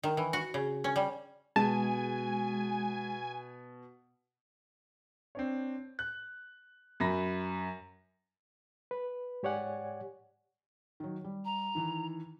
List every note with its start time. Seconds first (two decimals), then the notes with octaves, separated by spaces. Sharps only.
0.03 D#3
0.17 E3
0.33 F#4
0.54 C#3
0.84 C#4
0.96 G3
1.56 B2 G#3 G#5 A5
5.35 C4 D4 C#5
5.99 F#6
7.00 F#2 B5 A#6
8.91 B4
9.43 G#2 G4 C#5 D5 F#5 G#5
11.00 D#3 F#3
11.24 G3
11.45 A#5
11.75 D#3 E3